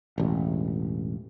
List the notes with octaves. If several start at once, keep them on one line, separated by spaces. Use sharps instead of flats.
E1 A1